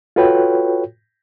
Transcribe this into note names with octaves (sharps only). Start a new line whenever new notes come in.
F4 F#4 A4 B4 C#5 G5